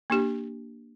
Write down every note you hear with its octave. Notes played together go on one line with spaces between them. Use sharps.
A#3 D4 G4